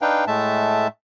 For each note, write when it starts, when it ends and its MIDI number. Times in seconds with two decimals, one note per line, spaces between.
0.02 0.25 62
0.02 0.25 63
0.02 0.25 71
0.02 0.25 77
0.02 0.25 79
0.27 0.87 45
0.27 0.87 56
0.27 0.87 57
0.27 0.87 76
0.27 0.87 81